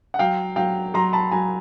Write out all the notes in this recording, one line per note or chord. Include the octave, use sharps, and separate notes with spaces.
F#5
F#3 F5 G5
F#3 F5 G5
F#3 A#5 C6
A5 B5
F#3 G#5 A#5